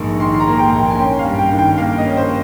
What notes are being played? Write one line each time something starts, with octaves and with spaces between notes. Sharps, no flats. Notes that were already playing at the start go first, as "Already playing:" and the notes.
Already playing: A#1 G#2 A#3 C#6
D#3 C6
C6
A#5
A#3
G5
A#1
G5
G#5
C#4 G5
F5
G2
G5
D#3
G5
A#3 F5
D#5
C#4
C5